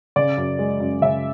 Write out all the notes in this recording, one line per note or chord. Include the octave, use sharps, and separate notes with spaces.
C#3 D5
F#2
G#3
F#2
C#3 E5